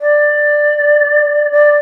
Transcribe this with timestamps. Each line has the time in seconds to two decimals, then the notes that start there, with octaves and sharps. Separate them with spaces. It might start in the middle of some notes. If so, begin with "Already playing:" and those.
0.01 D5
1.52 D5